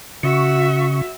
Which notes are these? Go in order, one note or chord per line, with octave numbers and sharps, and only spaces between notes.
C#3 F#4 E5 C#6